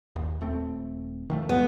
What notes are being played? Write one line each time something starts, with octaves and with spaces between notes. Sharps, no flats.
D#2
D#1 A3 C4
D#3 F3 A3
D2 F3 G#3 B3